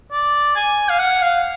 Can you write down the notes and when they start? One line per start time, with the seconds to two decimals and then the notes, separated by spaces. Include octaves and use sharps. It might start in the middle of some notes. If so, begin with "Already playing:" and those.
0.12 D5
0.55 G#5
0.89 F5
0.99 F#5
1.21 F5